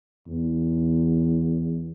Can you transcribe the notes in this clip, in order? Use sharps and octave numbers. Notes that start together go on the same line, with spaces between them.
E2